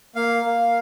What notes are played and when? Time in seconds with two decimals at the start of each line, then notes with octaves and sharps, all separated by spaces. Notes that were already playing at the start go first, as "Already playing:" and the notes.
0.16 A#3 F5
0.45 A#3